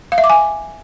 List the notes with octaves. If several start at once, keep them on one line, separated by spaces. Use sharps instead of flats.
F5
E5
D6
G#5